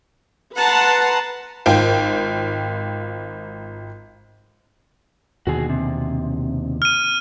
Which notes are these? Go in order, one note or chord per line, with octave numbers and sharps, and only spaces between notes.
B4 F#5 A5 A#5 C6
G#1 F4 C5 G5
D#2 B2 D3 F#4 G#4
C3
F6 D#7